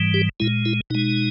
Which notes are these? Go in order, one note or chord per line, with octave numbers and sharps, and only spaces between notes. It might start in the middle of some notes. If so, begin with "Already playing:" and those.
Already playing: G#2 E3 G3
G4
A#2 G#3 E4
E4
B2 G#3 D#4